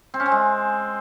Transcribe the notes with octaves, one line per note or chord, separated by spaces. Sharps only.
C4
C#4
C4
G#3